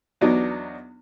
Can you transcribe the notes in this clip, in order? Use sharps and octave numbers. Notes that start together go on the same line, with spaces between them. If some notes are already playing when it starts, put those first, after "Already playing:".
E2 F#3 B3 D4 D#4